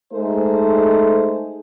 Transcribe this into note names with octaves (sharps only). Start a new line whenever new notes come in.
G#3 A3 D#4 G#4 A4 C5